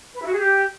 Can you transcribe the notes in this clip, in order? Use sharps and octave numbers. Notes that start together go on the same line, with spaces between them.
B4
E4
F#4
G#4
G4